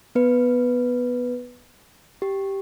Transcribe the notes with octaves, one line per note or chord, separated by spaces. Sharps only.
B3 B4
G4